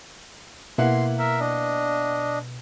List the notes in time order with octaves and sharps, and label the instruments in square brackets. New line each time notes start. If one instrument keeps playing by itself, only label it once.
[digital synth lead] B2 [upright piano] A#3 E4 F#5 [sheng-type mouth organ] C6
[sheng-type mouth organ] A#4 E5
D4 D#5